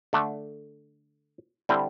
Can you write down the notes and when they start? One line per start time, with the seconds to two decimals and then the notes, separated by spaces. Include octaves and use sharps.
0.13 D3 A3 D4
1.69 D3 G3 C4 E4